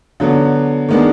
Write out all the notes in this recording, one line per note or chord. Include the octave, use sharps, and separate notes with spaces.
D3 F#3 B3
D#3 G#3 B3 D4